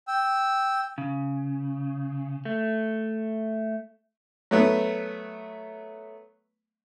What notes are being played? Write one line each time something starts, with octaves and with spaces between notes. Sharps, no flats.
G5 E6
C#3
A3
F#3 A3 B3